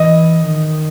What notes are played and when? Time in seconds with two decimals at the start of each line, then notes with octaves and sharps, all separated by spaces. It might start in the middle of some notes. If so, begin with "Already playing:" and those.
Already playing: E3 D#5
0.46 D#3